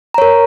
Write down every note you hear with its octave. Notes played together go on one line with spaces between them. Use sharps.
A#4 C#5 A#5